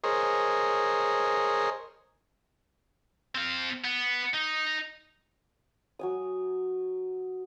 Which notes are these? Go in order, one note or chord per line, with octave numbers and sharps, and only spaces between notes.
G#4 A#4 C5 C#5 D#5
C4 F5
B3
D#4
F#3 G#5 D#6